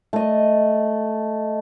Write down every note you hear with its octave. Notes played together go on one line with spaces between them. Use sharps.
A3 D#5